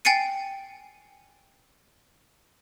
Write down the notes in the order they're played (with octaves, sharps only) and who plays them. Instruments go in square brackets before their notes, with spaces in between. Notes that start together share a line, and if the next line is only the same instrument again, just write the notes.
[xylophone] G5 G#5 A6 C7 C#7 D#7